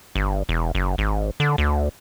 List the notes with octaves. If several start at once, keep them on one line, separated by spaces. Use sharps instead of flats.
G1
E1
F#1
G#1
D3
D2